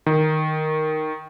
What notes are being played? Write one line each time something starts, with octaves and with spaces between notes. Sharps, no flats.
D#3